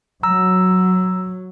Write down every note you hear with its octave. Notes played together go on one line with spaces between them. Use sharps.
F#3 A#5 E6